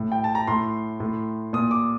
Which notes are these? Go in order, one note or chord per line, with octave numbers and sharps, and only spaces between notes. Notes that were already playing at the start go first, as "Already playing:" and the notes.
Already playing: A2
G5
A5
A#5
A2 C6
A2
A#2 D#6
D6